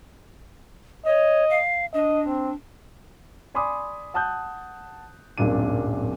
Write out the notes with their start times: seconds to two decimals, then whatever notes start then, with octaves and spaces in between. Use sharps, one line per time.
1.06 C#5 D#5
1.50 F5
1.94 D4 D#5
2.28 C4
3.54 D5 G#5 B5 C6 D6 D#6
4.14 F#5 A5 D#6 F#6 G6
5.38 D1 G#1 F#2 A#2 D4 D#7